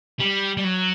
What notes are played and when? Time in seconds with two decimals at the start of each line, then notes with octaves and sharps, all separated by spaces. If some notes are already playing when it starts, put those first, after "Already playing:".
0.20 G3
0.57 G3
0.64 F#3